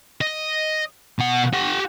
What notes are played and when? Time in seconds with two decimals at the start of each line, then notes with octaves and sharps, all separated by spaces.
0.21 D#5
1.19 B2 F#5
1.53 G4 F#5